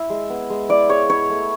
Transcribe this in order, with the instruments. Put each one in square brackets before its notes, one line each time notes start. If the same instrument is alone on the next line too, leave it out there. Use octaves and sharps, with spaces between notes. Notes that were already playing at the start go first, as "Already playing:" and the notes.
Already playing: [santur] E4 E5
G#3
B3
G#3
E4 D5
G#3 C#5
E4 C#5
A3